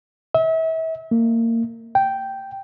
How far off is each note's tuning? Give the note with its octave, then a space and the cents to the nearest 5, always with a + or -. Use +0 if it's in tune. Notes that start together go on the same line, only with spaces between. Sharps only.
E5 -35
A#3 -25
G5 -5